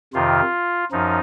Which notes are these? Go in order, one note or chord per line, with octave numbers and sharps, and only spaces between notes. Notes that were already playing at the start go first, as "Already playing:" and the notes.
F2 C3 D#3 F4
F#2 F3 D#4